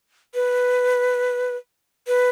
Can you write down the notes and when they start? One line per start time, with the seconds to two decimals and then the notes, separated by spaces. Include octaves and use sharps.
0.34 B4
2.07 B4